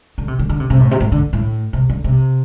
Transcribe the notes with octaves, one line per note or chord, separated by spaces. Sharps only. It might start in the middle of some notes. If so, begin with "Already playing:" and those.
D3
C3
D3
D3
C3
C3
A2
C3
A2
D3
A2
C3
D3
C3